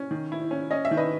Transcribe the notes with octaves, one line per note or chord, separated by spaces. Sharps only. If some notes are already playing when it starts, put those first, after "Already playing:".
Already playing: C#4
D#3
E4
C#4
C#4 D#5
E5
D#3
B4 D#5